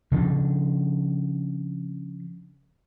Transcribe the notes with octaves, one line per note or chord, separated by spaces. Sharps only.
C#3 F3 D4